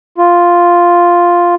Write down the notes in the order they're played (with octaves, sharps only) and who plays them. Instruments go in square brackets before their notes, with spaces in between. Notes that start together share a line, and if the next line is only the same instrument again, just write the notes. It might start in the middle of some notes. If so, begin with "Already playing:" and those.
[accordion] F4